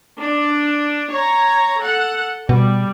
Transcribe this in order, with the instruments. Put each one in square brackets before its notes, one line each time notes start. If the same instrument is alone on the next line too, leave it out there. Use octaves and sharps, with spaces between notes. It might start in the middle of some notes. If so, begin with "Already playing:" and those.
[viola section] D4
C#5 A#5
A4 F#5
[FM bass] B2 [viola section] G3